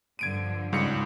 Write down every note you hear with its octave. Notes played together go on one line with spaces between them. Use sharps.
G2 D3 F3 G#6 D7 D#7
C#2 G#2 G3 C#7